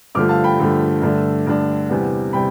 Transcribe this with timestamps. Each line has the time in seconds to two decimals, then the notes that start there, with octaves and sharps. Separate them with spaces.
0.15 G2 D3 F3 A3 D6 F6
0.29 F5 A5
0.44 G5 B5
0.59 G2 D3 F3 A3
1.02 G2 D3 A3 D4
1.47 G2 D3 A3 D4
1.90 E2 C3 G3 B3
2.33 C3 G3 G5 B5